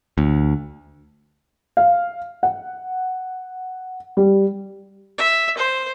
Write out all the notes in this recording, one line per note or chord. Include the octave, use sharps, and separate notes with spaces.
D2
F5
F#5
G3
E5
C5